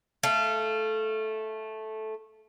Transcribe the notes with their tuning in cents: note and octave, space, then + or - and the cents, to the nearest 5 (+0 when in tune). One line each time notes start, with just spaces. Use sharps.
A3 -10 F5 -25